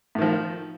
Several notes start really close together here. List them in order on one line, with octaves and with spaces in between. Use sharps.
A2 D#3 F3